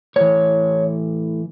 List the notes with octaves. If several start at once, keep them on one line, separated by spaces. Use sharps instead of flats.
A2 E3 C#5